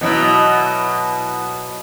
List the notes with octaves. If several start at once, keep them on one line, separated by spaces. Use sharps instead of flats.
B2 F#3 E4